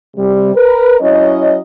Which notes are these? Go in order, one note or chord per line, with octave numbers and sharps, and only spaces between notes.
C3 G3
A#4 B4
F#3 C#4 E4 C#5 D#5